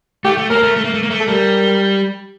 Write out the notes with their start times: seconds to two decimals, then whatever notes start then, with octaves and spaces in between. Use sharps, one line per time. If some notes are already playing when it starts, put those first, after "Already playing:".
0.24 A3 G4
0.38 A3
0.50 A#3 A#4
0.63 A3
0.76 A3
0.84 A#3
0.94 A3
1.03 A#3
1.10 A3
1.20 A4
1.27 G3 A#4